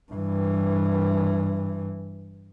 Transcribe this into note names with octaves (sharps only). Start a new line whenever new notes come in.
G2 E3